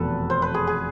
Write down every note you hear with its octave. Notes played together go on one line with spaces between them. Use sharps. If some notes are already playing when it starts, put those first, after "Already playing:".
Already playing: F1 E2 B2 A4 B4
C5
B4
G#4
G#4